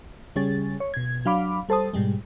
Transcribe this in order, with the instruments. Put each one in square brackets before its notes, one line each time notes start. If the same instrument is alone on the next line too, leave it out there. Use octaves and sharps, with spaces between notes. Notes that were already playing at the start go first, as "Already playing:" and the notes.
[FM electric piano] C#3 G3 C#4 G#4 A6
C#5
B2 G#6
F#3 D4 F5 B5 D6
G3 A4 C5 A5 D#6
G#2 B2 G3 G#3